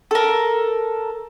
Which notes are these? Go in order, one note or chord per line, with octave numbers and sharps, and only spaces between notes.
A4 A#4